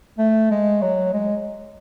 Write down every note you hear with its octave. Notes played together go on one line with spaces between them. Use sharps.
A3
G#3
F#3
G#3